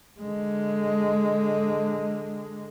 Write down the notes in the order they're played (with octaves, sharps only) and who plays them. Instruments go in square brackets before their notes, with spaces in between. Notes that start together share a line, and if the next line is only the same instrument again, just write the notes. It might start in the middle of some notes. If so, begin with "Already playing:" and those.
[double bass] D3 G#3